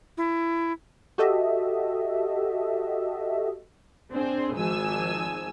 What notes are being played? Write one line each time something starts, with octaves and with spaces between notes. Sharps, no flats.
E4
F#4 G4 A4 D#5 E5
C4 D4 G#4 C5
G#1 F3 G#5 E6